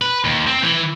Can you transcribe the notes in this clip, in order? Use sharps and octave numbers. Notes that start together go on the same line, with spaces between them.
B4
D#2
C4
E3